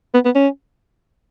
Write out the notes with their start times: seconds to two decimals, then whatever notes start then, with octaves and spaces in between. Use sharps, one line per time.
0.14 B3
0.25 B3
0.35 C#4